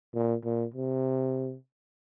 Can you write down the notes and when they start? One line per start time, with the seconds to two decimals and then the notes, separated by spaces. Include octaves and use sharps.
0.14 A#2
0.45 A#2
0.74 C3